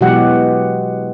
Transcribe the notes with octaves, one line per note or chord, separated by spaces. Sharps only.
B2 E3 F#3 G#3 G4 F#5